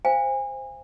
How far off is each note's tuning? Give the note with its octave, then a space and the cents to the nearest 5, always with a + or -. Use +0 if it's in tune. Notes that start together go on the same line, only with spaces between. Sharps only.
C5 +0 F5 +0 G#5 -35